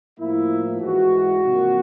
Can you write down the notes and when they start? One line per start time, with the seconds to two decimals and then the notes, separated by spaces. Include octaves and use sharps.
0.18 A2 F3 A#3 E4
0.81 G#2 E3 G#3 F#4
1.43 C3 F3 A#3